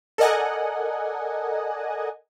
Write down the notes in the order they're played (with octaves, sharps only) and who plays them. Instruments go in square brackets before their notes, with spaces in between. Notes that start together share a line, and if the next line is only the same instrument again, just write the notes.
[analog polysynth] A4 A#4 D5 D#5 F#5 G#5